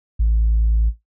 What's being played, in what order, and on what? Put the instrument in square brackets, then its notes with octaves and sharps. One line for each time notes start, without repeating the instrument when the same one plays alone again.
[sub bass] A1